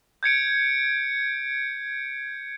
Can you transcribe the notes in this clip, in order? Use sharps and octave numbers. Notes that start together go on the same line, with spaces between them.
G6 G#6 C#7 D7